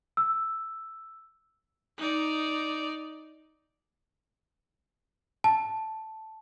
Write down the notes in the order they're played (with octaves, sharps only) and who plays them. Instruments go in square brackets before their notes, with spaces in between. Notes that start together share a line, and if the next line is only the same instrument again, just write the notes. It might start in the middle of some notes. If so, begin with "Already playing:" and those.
[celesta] E6
[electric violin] D#4 D5
[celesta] A5